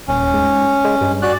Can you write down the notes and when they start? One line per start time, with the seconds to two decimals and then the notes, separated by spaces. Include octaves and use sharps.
0.08 D#1 C#4
0.34 G#2
0.85 G#3
1.01 G2
1.22 F#4 D5 F#6